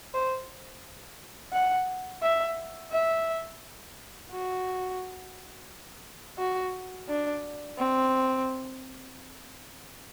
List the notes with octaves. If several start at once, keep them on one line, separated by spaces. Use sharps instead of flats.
C5
F#5
E5
E5
F#4
F#4
D4
C4